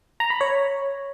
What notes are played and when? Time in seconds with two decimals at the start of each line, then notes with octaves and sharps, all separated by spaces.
0.20 A#5
0.30 B5
0.41 C#5